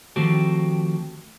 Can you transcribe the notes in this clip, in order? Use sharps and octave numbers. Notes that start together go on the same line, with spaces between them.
D#3 F3 A3 C4 F#4 G4